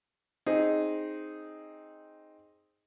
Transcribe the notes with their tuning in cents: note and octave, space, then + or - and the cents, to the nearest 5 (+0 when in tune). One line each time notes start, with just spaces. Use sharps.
C4 +10 D#4 +0 G#4 +0